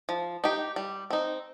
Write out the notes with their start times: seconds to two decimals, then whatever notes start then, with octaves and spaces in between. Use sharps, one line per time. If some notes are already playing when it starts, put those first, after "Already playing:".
0.09 F3
0.44 D#4 G4
0.76 G3
1.10 C4 D#4